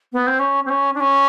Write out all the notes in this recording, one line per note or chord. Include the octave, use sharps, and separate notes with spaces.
B3
C4
C#4
C4
C#4
D4
C#4